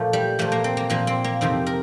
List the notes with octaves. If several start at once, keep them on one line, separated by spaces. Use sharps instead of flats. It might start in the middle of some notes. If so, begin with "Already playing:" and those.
Already playing: A#2 F3 A3
G3
A#2 F3 A3
A#3
C4
A#3
A#2 F3 A#3
C4
A#3
F2 C3 D#3 C4
A#4